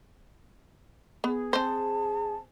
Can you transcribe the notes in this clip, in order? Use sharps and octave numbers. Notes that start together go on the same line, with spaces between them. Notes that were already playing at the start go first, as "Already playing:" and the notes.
B3 G#4
C4 C5 A5